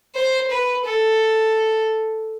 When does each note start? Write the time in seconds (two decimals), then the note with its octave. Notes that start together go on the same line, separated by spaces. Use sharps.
0.15 C5
0.50 B4
0.85 A4